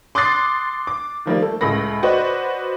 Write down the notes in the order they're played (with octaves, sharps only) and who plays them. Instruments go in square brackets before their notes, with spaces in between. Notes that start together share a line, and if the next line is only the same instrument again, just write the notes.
[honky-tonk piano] C6 D6 D#6 F#6 A6 C7
D6
D#3 F3 G3 A#3
A3 A4
C#2 A2 A3 B5 A#6
F#4 B4 C5 D5 D#5